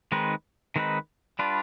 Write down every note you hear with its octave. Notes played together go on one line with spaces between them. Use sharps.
D#3 G#3 C4 D#4 B4
D#3 G#3 C4 D#4 B4
G3 D4 F4 B4